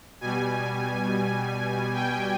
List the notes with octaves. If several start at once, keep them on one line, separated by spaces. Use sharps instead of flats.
B2 G3 G#5
G5